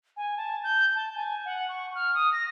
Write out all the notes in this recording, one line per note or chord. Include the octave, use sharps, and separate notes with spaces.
G#5
A5
G6
A5
G#5
F#5
C#6
F6
D#6
A#6